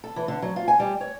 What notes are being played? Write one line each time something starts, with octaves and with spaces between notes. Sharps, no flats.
A4
E3
D3
F#3
F4
G#5
G3
C#5